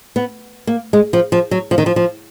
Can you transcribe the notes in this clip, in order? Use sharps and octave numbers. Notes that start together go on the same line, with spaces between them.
B3
A#3
G#3
F3
F3
F#3
F3
D#3
F3
F3